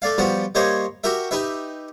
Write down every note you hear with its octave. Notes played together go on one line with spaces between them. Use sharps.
A3 D5 F5
F3 G3 B3 F#4
G3 A#3 C5 C#5 D#5
F#4 G4 A#4 E5
D#4 G4 B4 E5